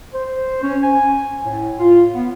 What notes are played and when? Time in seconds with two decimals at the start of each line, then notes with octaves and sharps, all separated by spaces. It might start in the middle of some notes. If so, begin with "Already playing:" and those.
0.14 C5
0.62 C#4
0.82 G#5
1.43 A2
1.79 F4
2.14 B3